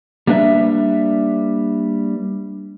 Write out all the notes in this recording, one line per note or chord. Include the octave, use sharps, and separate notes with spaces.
G3 A#3 D4 B4 E5